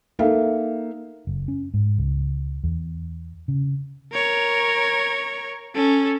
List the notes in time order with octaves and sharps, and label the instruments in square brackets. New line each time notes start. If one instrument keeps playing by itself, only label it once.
[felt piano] A#3 D#4 A4 E5 F5
[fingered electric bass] F#1
C#4
G#2
C#2
E2
C#3
[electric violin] A#4 C#5
C#4 A4